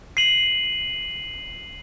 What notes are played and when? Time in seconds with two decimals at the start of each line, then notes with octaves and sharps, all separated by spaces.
0.17 C7 D#7 F#7